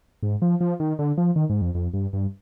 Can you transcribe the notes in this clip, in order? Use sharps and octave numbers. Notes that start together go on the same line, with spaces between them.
G#2
F3
F3
D#3
D3
F3
D#3
G#2
F2
F2
G2
G2